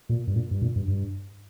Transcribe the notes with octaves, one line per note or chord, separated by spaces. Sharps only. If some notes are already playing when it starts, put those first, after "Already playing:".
A#2
G2
A#2
G2
A#2
G2
G2